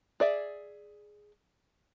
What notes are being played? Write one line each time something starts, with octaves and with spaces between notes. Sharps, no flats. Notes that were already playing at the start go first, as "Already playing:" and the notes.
G#4 D5 E5